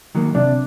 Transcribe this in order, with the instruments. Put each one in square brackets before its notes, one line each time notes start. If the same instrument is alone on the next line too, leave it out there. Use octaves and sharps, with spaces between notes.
[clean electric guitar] D#3 F#3 A#3
[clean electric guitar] C3 [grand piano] D4